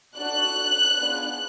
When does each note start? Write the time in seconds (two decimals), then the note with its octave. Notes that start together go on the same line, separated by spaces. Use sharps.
0.17 D4 F#4 A4 F#6
0.99 B3 D4 F4 G#4